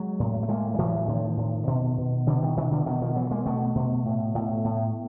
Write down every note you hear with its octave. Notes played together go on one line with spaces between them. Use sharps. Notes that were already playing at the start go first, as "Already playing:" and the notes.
Already playing: F#3 G#3
A2
A3
A2 G#3 A#3
G3
A2 E3 F#3
A2 D#3 F3
A2
B2
B2
B2 D3 E3
D#3
B2 D#3
D3 E3
B2 D#3
D#3 F3
B2 E3 F#3
G#3 A#3
B2 A3 B3
B2
A2
A2
A2